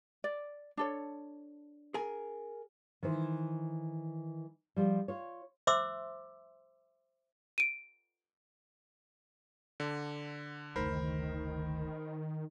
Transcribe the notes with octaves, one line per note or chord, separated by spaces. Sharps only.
D5
D4 A4 C#5
G#4 A#4 G#5
D#3 E3 C5
F3 G3
F4 C#5
C5 E5 C6 D6 E6
D7 D#7
D3
F#1 D2 D#3 A#4 C5 B5